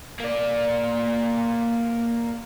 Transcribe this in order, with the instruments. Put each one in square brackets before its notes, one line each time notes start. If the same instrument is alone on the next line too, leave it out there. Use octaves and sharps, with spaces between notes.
[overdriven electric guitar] A#3 D5